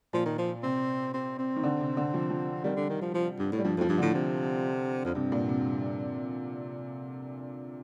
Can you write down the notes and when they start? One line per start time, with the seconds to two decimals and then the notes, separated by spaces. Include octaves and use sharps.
0.13 A#2 F3
0.25 D#3
0.38 F3
0.63 C3 C4
1.14 C4
1.39 C4
1.56 D#3
1.63 D3
1.80 C3
1.97 D3
2.14 F3
2.30 F3
2.64 D#3 G3
2.76 D3
2.89 D#3
3.02 F3
3.14 F3
3.39 G2
3.52 A2
3.58 G3
3.64 G2 F3
3.77 F2 F3
3.89 G2
3.98 A2 D3
4.14 C3
5.05 F2
5.15 G2 C3
5.32 A#2
5.49 C3